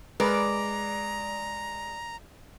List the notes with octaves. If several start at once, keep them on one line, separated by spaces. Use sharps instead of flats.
G#3 A#4 B4 D5 A#5